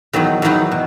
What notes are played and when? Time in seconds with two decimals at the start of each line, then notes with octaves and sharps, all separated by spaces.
0.13 E2 D#3 F#3 B3 D#4
0.42 E2 D#3 F#3 B3 D#4
0.72 B2